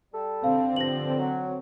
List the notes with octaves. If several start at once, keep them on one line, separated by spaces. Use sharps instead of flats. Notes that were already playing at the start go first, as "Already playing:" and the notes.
G3 A4
D3 C4 F5
G2 F3 A#6 F#7
F#3